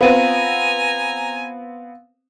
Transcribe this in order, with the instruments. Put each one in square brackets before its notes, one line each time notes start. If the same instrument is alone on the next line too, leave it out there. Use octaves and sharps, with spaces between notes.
[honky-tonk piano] B3 C4 [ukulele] F4 B4 [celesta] F5 D#7 [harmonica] G#5 A#5